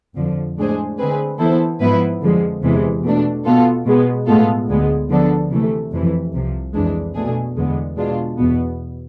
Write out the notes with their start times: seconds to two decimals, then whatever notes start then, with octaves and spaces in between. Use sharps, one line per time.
0.16 F2 D3 F3
0.57 A2 G#3 D4 G#4 C5
0.98 D3 G#3 C4 G#4 B4
1.39 E3 B3 E4 A4 C5
1.80 G#2 F3 B3 E4 B4
2.22 F2 D3 F3 G#3
2.63 E2 C3 E3 G#3
3.03 B2 A3 D4
3.45 B2 B3 F4 A4
3.86 B2 G#3 B3
4.27 A2 G#3 B3 F4 A4
4.68 D2 D3 G#3 B3
5.10 D3 F3 B3 D4 A4
5.51 C3 E3 A3
5.91 F2 C3 E3
6.32 C2 C3 F3
6.74 F2 E3 G#3 D4
7.15 B2 A3 D4 G#4
7.57 E2 D3 G#3 B3
7.97 B2 G#3 D4 F4
8.38 E2 B2 B3